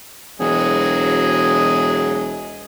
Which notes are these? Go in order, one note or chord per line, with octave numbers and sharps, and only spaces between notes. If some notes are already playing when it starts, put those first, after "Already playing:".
E1 F#3 G#4 D#5